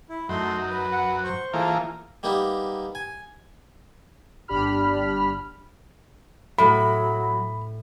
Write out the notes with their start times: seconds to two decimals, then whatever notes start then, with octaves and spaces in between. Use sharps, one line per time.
0.09 E4
0.29 F#2 A3 D#4 C6
0.70 B4
0.92 F#5
1.24 C5 C#6
1.53 E3 A#3 F4 G#4 A4
2.23 G3 A#3 B3 D#4 G4
2.95 G#5
4.48 G1 D4 G4 B5 F6
6.58 A2 F#3 B5